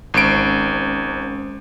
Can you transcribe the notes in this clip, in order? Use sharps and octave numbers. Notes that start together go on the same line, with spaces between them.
G#1 G#3 C#4 C5 D7